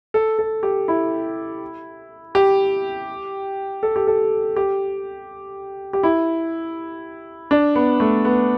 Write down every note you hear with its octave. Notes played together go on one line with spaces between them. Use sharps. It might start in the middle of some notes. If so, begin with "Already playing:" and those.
A4
A4
G4
E4
G4
A4
G4
A4
G4
G4
E4
D4
B3
A3
B3